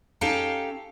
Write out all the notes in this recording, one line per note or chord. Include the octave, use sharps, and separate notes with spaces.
C#4 D#4 G4 A4 F5 G5